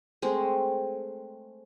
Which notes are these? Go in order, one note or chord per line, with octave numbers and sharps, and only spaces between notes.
G#3 A3 C4